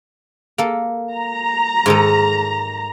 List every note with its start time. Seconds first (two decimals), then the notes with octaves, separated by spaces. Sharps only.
0.58 A#3 A4
1.13 A#5
1.86 G#2 D#3 A4